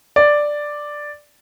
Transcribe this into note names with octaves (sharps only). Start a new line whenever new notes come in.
D5